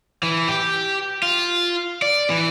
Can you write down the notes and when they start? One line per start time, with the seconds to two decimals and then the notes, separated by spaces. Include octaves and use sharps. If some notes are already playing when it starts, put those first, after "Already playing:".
0.23 E3
0.48 G4
1.23 F4
2.02 D5
2.30 E3